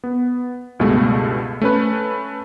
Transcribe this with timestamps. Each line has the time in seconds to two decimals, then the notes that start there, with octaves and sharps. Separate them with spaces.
0.04 B3
0.80 C#2 G2 B2 G#3 A3
1.62 A3 C#4 B4